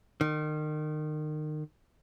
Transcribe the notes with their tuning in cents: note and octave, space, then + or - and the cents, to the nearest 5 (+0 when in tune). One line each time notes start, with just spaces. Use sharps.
D#3 -30